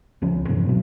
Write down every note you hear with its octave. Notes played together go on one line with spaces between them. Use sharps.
D#2 C#3 F3 C#4
C#2
G2 C3 E3 F3
B2 F#3